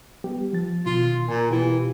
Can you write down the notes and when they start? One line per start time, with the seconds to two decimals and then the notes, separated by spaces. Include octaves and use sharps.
0.24 G3 B3 G4
0.53 F3 A6
0.86 B2 D#3 F4
1.28 A#2 G#5 A#5
1.51 B2 E3 F4 G4